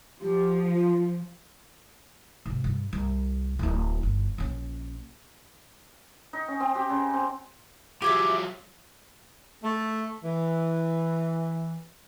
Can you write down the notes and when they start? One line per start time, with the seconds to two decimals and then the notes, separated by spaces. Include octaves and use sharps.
0.21 F3 G4
0.74 F4
2.46 G#2 C3
2.64 G2
2.93 C2
3.59 D1 E4
4.03 G1
4.38 A#1 C#4
6.33 D#4
6.48 C#4
6.60 C4
6.75 G4
6.90 C#3
7.13 C4
8.02 F3 F#3 G4 G#4 E5
9.64 A3
10.24 E3